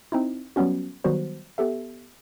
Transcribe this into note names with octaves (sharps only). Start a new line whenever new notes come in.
C4 D#4 E4
F#3 G3 B3 C#4 F#4
D#3 F#3 G3 B3 F#4 C5
B3 G4 A4 E5